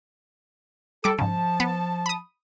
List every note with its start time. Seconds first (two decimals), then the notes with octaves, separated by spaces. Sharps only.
1.04 G3 A4 D6
1.19 G#2 C#3 F3 A5
1.60 B3
2.06 B5 D#6